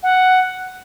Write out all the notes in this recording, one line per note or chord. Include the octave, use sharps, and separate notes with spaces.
F#5